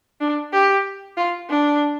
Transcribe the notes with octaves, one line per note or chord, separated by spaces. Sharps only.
D4
G4
F4
D4